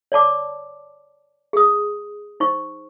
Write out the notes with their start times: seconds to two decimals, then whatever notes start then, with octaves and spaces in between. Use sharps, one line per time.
0.12 C#5 D5 A5 D6
1.53 G#4 D#6
2.40 D#4 C5 C#6